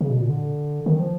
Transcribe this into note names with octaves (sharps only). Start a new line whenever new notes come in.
C#3
B2
A#2
D3
D#3
F3